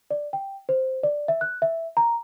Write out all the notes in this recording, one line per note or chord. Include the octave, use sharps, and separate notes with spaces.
D5
G5
C5
D5
E5
F#6
E5
A#5